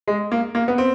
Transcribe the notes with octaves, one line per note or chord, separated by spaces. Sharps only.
G#3
A#3
A#3
B3
C4